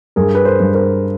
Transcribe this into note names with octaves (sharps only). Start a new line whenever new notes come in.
G2 G#4 A#4
B4
A#4 C5
G2
A#4 C5